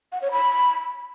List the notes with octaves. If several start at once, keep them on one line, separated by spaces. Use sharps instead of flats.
F#5
C#5
B5